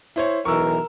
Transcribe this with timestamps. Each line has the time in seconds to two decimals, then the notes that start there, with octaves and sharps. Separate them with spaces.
0.16 E4 C5 C#5
0.45 B1 E3 A#4 C#6 E6